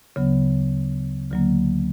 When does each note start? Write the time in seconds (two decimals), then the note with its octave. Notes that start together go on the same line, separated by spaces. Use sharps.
0.16 D2 C#3 F#3 B3
1.31 D2 D3 F#3 A#3